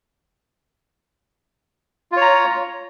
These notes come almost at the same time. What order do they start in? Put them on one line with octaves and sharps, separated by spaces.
F4 C#5 A#5